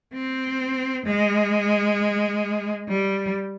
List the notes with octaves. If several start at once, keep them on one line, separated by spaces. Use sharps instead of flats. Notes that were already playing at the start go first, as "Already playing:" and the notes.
C4
G#3
G3